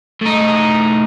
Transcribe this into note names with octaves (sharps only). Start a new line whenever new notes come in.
A2 D#4